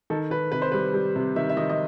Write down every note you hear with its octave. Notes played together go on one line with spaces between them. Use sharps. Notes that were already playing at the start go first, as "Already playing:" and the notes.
D#3 A4
D#3 B4
C3 B4
C5
G3 B4
G3
C3
D#3 E5
E5
D#3 D#5
D#5